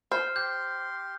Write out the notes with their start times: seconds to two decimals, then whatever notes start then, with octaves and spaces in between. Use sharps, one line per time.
0.12 C5 F6
0.36 G4 C6 G6